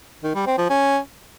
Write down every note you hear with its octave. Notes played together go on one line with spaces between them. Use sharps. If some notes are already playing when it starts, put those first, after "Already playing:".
D#3
G3
C4
F3
C#4